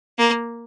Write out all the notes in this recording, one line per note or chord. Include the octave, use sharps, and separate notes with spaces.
A#3